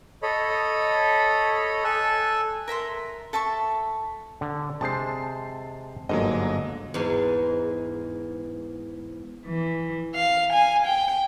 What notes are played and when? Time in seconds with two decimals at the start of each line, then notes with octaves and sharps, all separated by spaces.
0.23 A4 C#5 D#5 B5
1.84 A4 G#5 E6 F#6
2.68 A#4 E5 A#5 C6
3.33 A4 E5 A5 C#6
4.41 D3
4.81 C3 G#3 C5 A5 C7
6.09 G1 G#2 D3 F#3 A#3 D#5
6.94 E2 G#2
9.46 E3
10.15 F5
10.54 G#5
10.86 G5